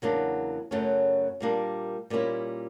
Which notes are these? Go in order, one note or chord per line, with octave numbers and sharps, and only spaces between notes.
E2 C#3 F#3 A#3 D4
F#2 C#3 F#3 A3 C#4
A#2 G3 A#3 D4
A#2 G3 A#3 C#4 E4